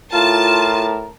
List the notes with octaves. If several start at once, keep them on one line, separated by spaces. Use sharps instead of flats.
A2 F4 A#4 A5